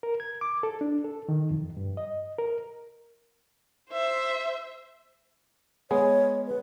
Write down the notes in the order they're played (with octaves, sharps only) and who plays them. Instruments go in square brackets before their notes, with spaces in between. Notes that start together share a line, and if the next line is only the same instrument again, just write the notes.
[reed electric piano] A#4
G#6
D6
A4
D4
A4
D#3
F2
G2
D#5
A#4
[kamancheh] C5 E5
[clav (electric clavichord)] G#3 B3 G#4 [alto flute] C#5
[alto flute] B4